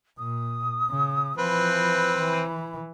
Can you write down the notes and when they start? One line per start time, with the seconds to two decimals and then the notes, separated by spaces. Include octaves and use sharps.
0.18 A#2 D#6
0.90 C#3
1.38 E3 F3 C4 B4 B5
2.18 E3